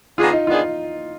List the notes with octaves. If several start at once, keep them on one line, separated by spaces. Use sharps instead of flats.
D#3 B3 D4 F4 G#4
D#4
D#3 B3 D4 F4 G#4